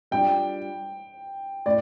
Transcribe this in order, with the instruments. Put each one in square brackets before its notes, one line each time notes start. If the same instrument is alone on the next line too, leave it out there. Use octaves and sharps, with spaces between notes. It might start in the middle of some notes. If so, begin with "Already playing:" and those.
[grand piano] G3 D4 F4 [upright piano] G5
[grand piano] A2 [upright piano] D5